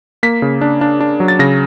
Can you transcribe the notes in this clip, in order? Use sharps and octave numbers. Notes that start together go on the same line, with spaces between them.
A#3 B6
C#3
D4
D4
D4
F#3
A6
C#3 A#6